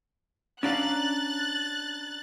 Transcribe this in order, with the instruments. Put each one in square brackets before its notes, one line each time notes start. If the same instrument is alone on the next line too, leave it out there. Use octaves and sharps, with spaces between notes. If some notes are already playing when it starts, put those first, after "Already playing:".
[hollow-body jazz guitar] C#4 D5 F5 [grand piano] D4 A#5 F7 [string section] F#6 A6